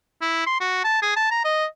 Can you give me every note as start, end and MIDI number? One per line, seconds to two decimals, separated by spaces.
0.21 0.43 64
0.46 0.60 84
0.60 0.82 66
0.84 1.01 81
1.02 1.12 68
1.16 1.28 81
1.31 1.40 82
1.44 1.65 75